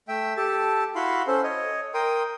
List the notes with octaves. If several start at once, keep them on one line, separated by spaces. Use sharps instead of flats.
A3 E5 G5
G4 A4 A5
E4 F#4 F5 B5 C6
C#4 A4 C5
C#5 D#5
A#4 G5 C6 D#6